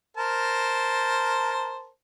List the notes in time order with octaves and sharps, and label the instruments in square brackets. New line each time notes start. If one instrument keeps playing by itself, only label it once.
[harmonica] A#4 C5 A5